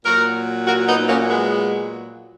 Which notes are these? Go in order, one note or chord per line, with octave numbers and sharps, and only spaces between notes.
A#2 F#3 F#4 A#4
F#4 A#4
B3 D#4
A#3 C#4
G#3 B3